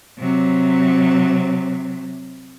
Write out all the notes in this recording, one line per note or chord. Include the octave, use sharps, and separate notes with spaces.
C3 F#3